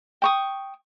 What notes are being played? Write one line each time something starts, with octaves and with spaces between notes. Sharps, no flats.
G5 C#6 D#6